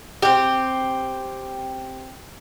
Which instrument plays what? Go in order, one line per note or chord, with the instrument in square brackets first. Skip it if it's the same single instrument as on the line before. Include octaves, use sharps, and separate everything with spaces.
[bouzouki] C4 G4